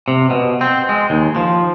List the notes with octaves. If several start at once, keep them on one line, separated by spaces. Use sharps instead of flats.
C3
B2
C4
G#3
D#2
F3